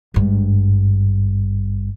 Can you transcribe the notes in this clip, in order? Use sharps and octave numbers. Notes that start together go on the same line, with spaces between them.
G#1 G2